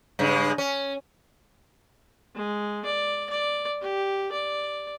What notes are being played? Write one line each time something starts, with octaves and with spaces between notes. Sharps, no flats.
G2 C#3 G#3
C#4
G#3
D5
D5
G4
D5